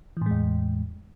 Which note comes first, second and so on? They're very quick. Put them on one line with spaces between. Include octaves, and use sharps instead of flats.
E3 A2 G#3 E2